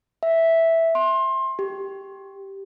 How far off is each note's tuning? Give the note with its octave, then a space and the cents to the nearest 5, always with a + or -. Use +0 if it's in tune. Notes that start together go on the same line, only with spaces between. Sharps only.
E5 -5
C6 +25
G4 -5